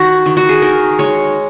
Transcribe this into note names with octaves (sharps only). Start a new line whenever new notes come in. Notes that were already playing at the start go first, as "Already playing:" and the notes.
Already playing: D#3 F#4
D#3
F#4
G#4
D#3 A#4
G#3 C#5